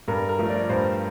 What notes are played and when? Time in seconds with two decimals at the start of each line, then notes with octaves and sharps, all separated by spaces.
0.08 G2 A#4
0.29 A#4
0.39 F3 A3
0.49 D5
0.69 G2 C5